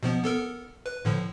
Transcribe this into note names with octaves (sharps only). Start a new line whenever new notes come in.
B2 F3 B3
B3 A4 A#4
B4
A2 D3 F3